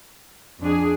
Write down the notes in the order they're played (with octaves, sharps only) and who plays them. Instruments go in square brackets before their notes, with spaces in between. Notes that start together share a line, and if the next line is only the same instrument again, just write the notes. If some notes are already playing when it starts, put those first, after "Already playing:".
[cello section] F2 G#4 [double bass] D4